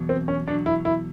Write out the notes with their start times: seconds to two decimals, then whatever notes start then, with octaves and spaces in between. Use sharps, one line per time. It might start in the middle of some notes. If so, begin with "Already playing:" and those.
Already playing: E2 B2 F#3
0.09 C4
0.28 C#4
0.47 E2 B2 F#3 D4
0.66 E4
0.85 E4